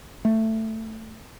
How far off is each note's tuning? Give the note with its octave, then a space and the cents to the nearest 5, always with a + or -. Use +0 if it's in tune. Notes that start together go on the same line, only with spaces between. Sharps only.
A3 +10